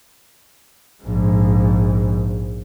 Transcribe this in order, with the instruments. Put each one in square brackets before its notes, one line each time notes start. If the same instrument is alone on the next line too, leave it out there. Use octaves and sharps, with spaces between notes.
[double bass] A#1 G#2